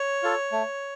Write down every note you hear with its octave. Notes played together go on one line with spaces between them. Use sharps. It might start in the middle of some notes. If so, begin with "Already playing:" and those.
Already playing: C#5
F4 A4
A3